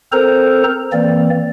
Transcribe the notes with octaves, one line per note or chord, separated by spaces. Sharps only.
C4 A4 A#4 C5 A#5
E3 A#3 C4 D5